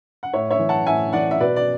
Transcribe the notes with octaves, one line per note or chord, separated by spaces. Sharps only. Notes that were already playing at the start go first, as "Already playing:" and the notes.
F#5
A2 C#5 E5
C#5 E5
E3
F#5 A5
A2 E5 G#5
E3 D5 F#5
E5
B2 B4 D5
D5